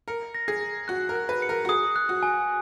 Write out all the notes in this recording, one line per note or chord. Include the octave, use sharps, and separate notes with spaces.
A#4 C#7
A#6
G#4
A#6
F#4 F#6
A#4
F#6
B4
C#7
A#4
F#4
G#4 D#6
F#6
F#4
G#5